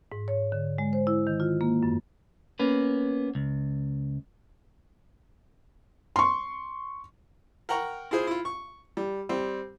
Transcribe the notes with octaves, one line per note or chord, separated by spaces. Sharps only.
G#2
C#5
D3
G#3
C5
E4
D#3
F4
A#3
F#2
A#3 B3 C#4 B4
C#2
C6 C#6
A#4 F#5 G5 A#5 C#6
E4 F4 G#4 C5
E4 F4
C#6
G3
G3 C4